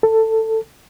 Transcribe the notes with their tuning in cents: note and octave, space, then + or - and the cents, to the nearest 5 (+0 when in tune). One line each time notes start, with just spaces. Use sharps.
A4 +15